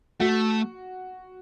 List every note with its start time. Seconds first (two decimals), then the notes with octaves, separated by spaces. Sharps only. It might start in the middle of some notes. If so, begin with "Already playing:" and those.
0.20 A3 F#4